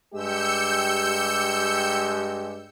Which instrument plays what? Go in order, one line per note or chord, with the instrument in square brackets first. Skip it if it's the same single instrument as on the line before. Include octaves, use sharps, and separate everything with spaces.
[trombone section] G2 G#3 G4 [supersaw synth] E6 G6 C#7